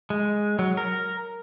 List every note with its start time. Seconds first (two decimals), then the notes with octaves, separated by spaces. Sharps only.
0.10 G#3
0.59 F#3
0.77 A#4